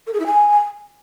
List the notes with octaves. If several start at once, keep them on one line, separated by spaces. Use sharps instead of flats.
A#4
G#4
E4
G#5